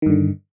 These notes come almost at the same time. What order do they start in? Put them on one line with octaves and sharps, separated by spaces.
D#3 G2 D3